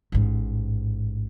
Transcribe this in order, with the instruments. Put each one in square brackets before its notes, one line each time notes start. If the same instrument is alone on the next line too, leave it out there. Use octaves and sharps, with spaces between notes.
[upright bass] A1 G#2